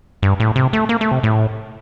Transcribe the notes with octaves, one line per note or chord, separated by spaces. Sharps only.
G2
A2
C3
A3
A#3
A3
C3
A2